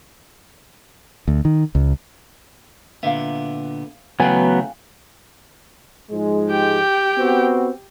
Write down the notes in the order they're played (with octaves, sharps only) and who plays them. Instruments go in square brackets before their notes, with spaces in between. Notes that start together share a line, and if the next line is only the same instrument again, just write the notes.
[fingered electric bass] D2
D#3
C#2
[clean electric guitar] A#2 D3 B3 [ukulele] E5 F5
[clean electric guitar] C#3 E3 A3 [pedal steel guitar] F#3 B3 [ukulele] F5 G5 G#5
[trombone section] G#2 F3 G#3
[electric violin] G4 G5
[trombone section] B3 C4 F#4